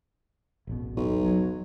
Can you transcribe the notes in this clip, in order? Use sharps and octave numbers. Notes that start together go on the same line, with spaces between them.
E1 A1 B2
B1
F#3